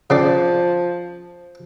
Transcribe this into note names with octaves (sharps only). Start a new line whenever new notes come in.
C#3 F3 C4 D5